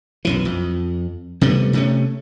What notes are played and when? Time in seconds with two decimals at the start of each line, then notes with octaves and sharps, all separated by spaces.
0.25 B1 F#2 E3
0.45 F2
1.41 C3 G3 A3 B3
1.73 C3 A3 C#4